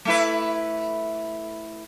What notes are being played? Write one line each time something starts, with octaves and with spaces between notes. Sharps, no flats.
A3 E4 B4